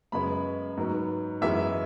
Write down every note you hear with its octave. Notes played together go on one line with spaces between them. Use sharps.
F#2 C#3 G#3 B3 B5
G#2 F#3 B3
F#2 E3 G#3 B3 E5